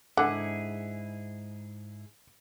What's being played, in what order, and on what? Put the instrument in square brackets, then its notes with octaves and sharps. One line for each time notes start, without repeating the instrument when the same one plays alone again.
[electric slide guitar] G#2 E4 G#4 [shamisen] D3 [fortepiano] F#5